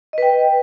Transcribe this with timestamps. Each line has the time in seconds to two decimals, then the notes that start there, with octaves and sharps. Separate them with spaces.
0.13 D#5
0.18 B4
0.22 G5